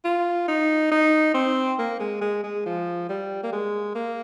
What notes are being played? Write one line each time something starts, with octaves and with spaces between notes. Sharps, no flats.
F4
D#4
D#4
C4
A#3
G#3
G#3
G#3
F3
G3
A#3
G#3
A#3